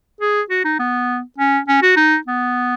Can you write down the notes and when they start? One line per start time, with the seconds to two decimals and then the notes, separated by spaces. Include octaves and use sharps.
0.21 G#4
0.50 F#4
0.65 D#4
0.79 B3
1.38 C#4
1.68 C#4
1.83 F#4
1.97 D#4
2.27 B3